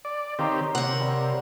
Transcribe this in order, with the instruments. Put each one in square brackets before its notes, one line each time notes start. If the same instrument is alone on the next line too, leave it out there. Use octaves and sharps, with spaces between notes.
[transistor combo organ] D5
[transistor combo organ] D#3 C4 G4 [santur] C#5 F5 A#5
[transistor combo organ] C3 [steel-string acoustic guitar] A#4 F#5
[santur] G3